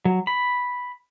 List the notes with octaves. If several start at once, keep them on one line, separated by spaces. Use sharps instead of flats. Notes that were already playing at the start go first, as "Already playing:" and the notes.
F#3
B5